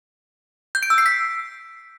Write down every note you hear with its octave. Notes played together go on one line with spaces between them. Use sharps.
G6
D7
E6
C7
B6